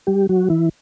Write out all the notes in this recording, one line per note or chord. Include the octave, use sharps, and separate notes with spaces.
G3 G4
F#3 F#4
E3 E4